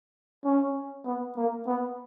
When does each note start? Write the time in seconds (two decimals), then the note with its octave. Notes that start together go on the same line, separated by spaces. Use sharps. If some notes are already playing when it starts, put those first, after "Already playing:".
0.44 C#4
1.05 B3
1.36 A#3
1.67 B3